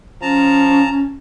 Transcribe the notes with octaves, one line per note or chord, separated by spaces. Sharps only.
F3 C#4 A5 A#5